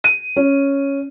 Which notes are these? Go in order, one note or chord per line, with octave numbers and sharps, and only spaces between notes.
D#7
C#4